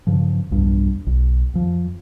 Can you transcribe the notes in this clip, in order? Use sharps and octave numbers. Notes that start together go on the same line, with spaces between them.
G2 C#3 F3
B1 E2 G2
B1
F2 F3